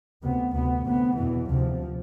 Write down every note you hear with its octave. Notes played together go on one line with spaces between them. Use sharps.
D2 C3 B3
D2 C3 B3
D2 C3 B3
E2 B2 E3
D2 C3 F3